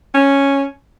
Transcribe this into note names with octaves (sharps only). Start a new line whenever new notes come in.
C#4